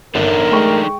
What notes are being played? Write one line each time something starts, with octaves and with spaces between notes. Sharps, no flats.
G1 A#3 D4 D#4 A4 A#4
G#3 A3 G5 C#6